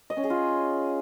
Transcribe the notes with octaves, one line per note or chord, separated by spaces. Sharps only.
D#5
C#4
G#4
F4